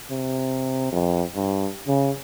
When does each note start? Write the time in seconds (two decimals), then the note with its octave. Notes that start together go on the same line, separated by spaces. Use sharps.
0.11 C3
0.92 F2
1.35 G2
1.88 C#3